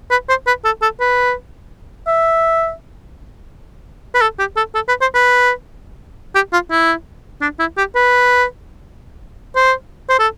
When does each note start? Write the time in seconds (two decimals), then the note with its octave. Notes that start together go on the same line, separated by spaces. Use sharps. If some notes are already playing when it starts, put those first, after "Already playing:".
0.11 B4
0.29 C5
0.47 B4
0.65 A4
0.82 A4
1.00 B4
2.07 E5
4.15 B4
4.21 A4
4.39 G4
4.57 A4
4.75 A4
4.88 B4
5.01 C5
5.15 B4
6.35 G4
6.53 F4
6.71 E4
7.42 D4
7.60 E4
7.78 G4
7.95 B4
9.56 C5
10.09 C5
10.19 A4